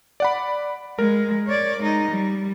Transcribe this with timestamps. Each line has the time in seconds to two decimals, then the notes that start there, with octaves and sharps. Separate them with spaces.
0.20 D5 F#5 B5
0.99 G#3 A#4
1.47 C#5 D5
1.80 G#3 D#4
2.11 G3